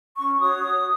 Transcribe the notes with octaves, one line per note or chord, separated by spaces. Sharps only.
C#4 C#6
F#4 C#5 D#6